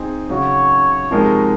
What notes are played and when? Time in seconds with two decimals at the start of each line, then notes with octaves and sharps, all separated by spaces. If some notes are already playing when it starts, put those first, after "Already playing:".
Already playing: C4 D#4 G#4
0.29 C#3 F#3 C#4 F#4 C#5
1.11 C3 F3 G#3 D#4 A#4